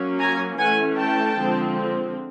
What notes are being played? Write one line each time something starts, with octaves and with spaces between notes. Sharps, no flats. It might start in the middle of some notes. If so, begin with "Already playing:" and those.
Already playing: F#3 A#3 C#4
G#5 A#5
E3 A3 C#4 F#5 G#5
G5 A5
D3 F3 G#3 C4